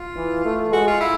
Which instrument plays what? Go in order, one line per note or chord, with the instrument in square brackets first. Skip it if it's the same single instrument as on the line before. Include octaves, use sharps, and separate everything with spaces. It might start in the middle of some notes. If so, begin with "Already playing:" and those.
Already playing: [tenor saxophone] F4
[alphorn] E3
A3
[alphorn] G#3 [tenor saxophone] F#4
[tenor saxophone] F4
E4